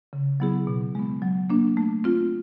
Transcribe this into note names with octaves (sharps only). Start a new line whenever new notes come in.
C#3
F#3 B3 E4 G#4
B2
G#3 B3
F#3
A#3 D4
A3
C4 F4